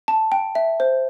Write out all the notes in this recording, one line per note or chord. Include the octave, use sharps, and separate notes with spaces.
A5
G5
E5
C5